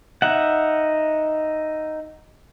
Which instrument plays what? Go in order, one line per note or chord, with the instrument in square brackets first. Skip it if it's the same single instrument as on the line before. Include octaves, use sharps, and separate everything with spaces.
[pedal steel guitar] D#4 E5 F#5